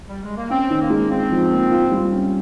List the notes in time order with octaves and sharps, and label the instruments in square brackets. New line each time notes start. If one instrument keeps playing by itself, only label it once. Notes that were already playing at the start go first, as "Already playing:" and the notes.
[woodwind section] G3
G#3
A#3
[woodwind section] C4 [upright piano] C#4
[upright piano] D#3
[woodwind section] A#3
[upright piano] G#3
[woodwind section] C4 [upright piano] D#4
[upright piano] F3
A#3
F4
G3
C#4